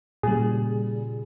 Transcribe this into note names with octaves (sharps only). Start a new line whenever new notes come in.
A#2 C#3 G3 G#4